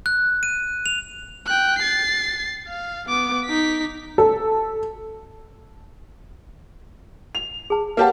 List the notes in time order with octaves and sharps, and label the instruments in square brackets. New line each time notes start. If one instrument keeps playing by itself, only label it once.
[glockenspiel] F#6
D#7
F7
[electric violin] G5 F#6
A6 C7
F5
B3 D6
D#4 B6
[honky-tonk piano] A4
F7
[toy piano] G#4 A5
[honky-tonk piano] A#3 G4 A5 [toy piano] B4 C#5 F#5